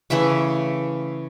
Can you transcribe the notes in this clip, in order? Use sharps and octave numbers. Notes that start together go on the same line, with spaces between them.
C#3 E3 A3 E5